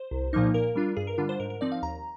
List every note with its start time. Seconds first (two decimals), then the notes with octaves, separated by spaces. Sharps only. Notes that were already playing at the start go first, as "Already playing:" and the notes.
Already playing: C5
0.11 C2
0.33 A#2 F3 A#3 D#4
0.54 A#2 A#4
0.76 G3 D4 F4
0.97 G2 G#4
1.07 A#4
1.18 D3 G3 D4 F4
1.29 C5
1.40 G#2 A#4
1.50 A#4
1.61 F3 C4 D#4 D5
1.72 F5
1.82 D#2 A#5